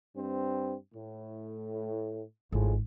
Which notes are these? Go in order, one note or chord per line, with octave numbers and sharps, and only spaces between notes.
G2 C4
A2
G#1 A2 F3 G#3